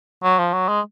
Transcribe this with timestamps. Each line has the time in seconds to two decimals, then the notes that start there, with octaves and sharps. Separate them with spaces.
0.23 F#3
0.38 F3
0.53 F#3
0.68 G#3